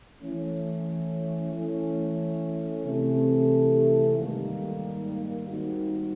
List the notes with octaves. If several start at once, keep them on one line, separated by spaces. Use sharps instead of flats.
E3 A3 C#4
E3 A3 C#4
C3 E3 A3
G#2 D#3 G3 A#3
D#3 G3 C4 D#4 F#4